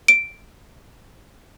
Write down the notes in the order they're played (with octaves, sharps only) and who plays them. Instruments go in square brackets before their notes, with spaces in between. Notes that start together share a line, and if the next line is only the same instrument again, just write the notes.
[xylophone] D7